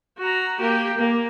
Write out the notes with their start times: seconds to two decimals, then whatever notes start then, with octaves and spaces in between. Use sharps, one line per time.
0.18 F#4 A#5
0.59 A#3 G4
0.97 A#3